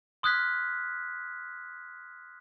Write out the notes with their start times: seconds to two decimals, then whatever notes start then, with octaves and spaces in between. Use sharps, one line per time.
0.23 C6 D#6 F6 F#6 G#6 B6